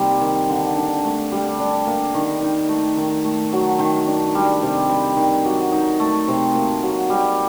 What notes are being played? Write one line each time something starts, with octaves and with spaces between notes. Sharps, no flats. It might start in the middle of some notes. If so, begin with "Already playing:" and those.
Already playing: C3 G3 A#3 D#4
D#3
D3
D4
A3
G3
D4
A#3
D#3
D#4
A3
D#3
A3
F#3
D#3
D4
G3
C3
G3
D#3
F#3
D#4
A3
C3
A#3
F#3
G3